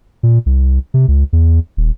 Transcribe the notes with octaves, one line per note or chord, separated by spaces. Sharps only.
A#2
C2
C3
C#2
E2
D#1